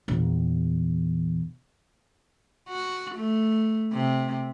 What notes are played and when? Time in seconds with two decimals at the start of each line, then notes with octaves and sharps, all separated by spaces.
0.08 A#1 E2
2.69 F#4
3.16 A3
3.92 C3